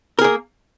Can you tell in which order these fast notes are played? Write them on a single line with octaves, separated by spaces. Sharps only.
A#4 G#4 A#3